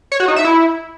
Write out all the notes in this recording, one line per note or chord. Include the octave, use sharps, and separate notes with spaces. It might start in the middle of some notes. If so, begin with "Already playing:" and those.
C#5
F#4
D#4
E5
E4